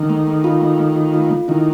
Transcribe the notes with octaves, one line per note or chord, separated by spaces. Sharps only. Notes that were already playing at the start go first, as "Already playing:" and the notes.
Already playing: D#3
A3
A3
F4
A3
A3
F4
F4
A3
D#3 E4